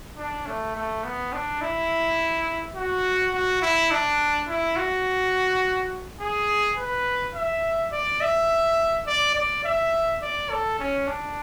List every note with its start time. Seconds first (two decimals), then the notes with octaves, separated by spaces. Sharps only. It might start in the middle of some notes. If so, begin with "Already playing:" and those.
0.17 D4
0.47 A3
0.76 A3
1.04 B3
1.33 D4
1.61 E4
2.75 F#4
3.33 F#4
3.62 E4
3.91 D4
4.48 E4
4.76 F#4
6.20 G#4
6.77 B4
7.34 E5
7.92 D5
8.21 E5
9.07 D5
9.35 D5
9.64 E5
10.22 D5
10.50 A4
10.79 C#4
11.07 D4